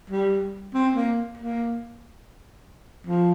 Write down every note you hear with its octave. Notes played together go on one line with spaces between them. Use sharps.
G3
C4
A#3
A#3
F3